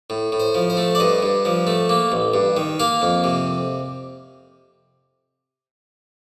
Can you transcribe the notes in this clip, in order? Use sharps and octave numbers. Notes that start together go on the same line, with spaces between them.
A2
A2
C5
F3
C5
A3
D5
G2 D#5
G2
F3
A3
A#3
A1
G2
D#3
A#3 F5
F2
C3